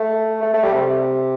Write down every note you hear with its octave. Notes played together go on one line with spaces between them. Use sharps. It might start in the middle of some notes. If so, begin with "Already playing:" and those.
Already playing: A3
A3
A3
G3
C3